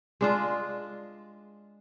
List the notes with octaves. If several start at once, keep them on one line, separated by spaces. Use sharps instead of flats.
G#3 D4 F4